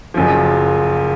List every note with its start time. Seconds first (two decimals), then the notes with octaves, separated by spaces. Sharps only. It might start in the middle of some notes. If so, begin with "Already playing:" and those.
0.14 F#1 F#2 F3